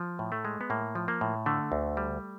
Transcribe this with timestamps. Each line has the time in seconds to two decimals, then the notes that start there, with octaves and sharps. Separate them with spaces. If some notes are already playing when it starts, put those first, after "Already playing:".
Already playing: F3
0.19 A2
0.32 A3
0.45 G#3
0.61 B3
0.70 A2 A#3
0.95 F3
1.08 A#3
1.21 A2
1.46 D3 A3
1.72 D2
1.97 G3